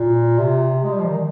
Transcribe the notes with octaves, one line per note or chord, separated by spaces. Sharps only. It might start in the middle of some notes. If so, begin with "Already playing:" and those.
Already playing: A#2
C3
G#3
G3
F3
D#3